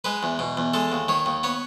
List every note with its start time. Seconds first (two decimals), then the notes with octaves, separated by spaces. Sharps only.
0.04 G#3 B4
0.23 E2
0.39 B2
0.57 E2
0.74 G#3 A4
0.92 D#2
1.08 D#3 C#5
1.26 D#2
1.43 B3 C#5